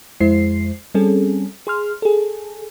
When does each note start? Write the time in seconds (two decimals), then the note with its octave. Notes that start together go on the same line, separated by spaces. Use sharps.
0.21 F2 G#3 E4 C5 C7
0.95 G3 C4 C#4 G#4 A4
1.67 G#4 C6 F6
2.02 G#4 A4